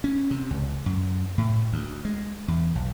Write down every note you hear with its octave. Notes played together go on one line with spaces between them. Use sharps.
C#4
C3
C#2
F#2
A2
D2
G#3
E2
B1